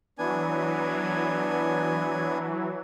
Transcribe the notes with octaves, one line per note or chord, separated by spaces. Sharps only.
E3 F#3 B3 D4 G#5